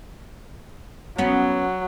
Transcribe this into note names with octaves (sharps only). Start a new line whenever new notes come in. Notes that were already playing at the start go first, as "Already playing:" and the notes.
F#3 B3 C#4